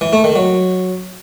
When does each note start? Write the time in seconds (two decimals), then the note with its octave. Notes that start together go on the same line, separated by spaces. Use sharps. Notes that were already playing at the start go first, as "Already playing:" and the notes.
0.01 E3
0.13 A3
0.24 D#3
0.36 F#3